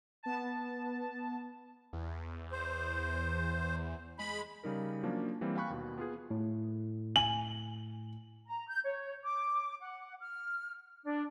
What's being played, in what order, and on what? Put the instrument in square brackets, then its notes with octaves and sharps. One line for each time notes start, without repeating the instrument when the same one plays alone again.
[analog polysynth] B3 A5
[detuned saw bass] E2
[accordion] C5
[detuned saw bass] G#3 [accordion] B5
[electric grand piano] C#3 G3 D#4 A#4
F3 F#3 A#3 C#4 D4
E3 G3 A#3 C4
F5 G5 G#5 B5 C#6 F#6
D#2 B2
B3 F4 G#4
[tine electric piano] A2
[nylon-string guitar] G#5 [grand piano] F#7
[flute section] A#5
G6
C#5
D6
F#5
F6
D4